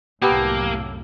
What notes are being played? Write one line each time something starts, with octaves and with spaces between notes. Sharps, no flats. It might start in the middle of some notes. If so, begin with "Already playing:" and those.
C2 F#2 A2 A#3 B3 G4 A4